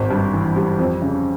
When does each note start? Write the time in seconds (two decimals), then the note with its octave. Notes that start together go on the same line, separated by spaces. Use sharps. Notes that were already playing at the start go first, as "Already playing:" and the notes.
Already playing: G#1
0.10 G2
0.34 E3
0.56 G3
0.79 F2
1.02 C#3